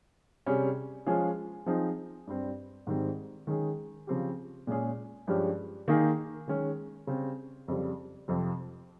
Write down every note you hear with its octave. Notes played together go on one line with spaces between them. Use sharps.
C3 G3 C#4 G#4
F3 G#3 C#4 F4 G#4
F3 C4 D#4 G#4
G2 G3 C4
G#2 D#3 G3 C4
D#3 G#3 C#4 G#4
C#3 F3 C4 G4
A#2 G#3 C#4 G#4
G2 F3 G#3 C#4 G4
D#3 A#3 D#4 G#4
D#3 G#3 C#4
C#3 G3 C4
F2 C#3 G3
F2 C3 F3 C4